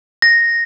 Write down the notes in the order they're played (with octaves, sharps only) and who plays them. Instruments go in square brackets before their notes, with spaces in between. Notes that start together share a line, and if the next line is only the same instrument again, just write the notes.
[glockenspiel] A#6